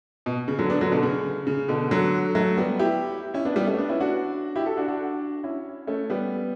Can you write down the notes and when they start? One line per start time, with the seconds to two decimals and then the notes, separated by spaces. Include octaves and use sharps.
0.26 B2
0.48 C#3
0.59 D3 F#3
0.70 B3 D4
0.81 D3 F#3
0.91 B2 D3
1.03 C#3
1.47 C#3
1.68 B2 D3
1.91 D3 F#3
2.35 F#3 A3
2.57 G3 B3
2.79 E4 G4
3.34 C#4 E4
3.45 B3 D4
3.56 G3 B3
3.67 A3 C#4
3.78 B3 D4
3.89 C#4 E4
4.00 D4 F#4
4.56 E4 G4
4.66 F#4 A4
4.77 D4 F#4
4.88 D4 F#4
5.44 C#4 E4
5.87 A3 C#4
6.10 G3 B3